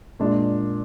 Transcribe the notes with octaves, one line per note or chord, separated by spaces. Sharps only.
A#2 G#3 D4